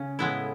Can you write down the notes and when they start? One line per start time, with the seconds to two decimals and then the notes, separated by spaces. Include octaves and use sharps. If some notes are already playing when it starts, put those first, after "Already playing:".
Already playing: C#3 C#4
0.19 A2 G#3 B3 E4